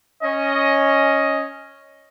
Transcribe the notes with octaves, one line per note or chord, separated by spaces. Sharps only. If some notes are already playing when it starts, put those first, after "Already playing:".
C#4 D#5